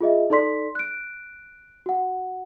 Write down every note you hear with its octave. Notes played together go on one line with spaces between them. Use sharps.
F4 G#4 D#5 E5
D#4 A4 D5 C6 B6
F#6 D7
F#4 F#5